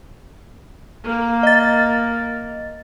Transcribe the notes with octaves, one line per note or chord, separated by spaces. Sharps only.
A#3
D#5 A6